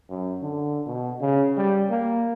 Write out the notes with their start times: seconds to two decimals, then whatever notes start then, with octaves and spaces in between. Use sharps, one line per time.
0.10 F#2
0.42 D3
0.87 B2
1.21 C#3
1.57 G3
1.90 A#3